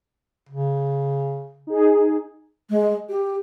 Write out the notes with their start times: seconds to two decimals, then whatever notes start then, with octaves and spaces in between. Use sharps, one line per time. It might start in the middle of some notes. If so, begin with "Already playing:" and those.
0.49 C#3
1.67 D#4 G#4
2.70 G#3
3.09 G4